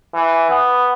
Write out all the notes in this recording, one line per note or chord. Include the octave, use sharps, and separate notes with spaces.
E3
B3